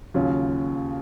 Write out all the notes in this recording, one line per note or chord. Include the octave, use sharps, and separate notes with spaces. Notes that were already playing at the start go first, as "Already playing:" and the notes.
D#2 C#3 F#3 C#4 F4